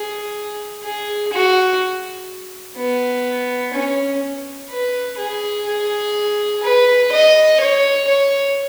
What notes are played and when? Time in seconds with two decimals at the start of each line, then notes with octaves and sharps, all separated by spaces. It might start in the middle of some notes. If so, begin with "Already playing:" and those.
Already playing: G#4
0.83 G#4
1.32 F#4
2.77 B3
3.74 C#4
4.70 B4
5.18 G#4
5.67 G#4
6.63 B4
7.12 D#5
7.60 C#5
8.08 C#5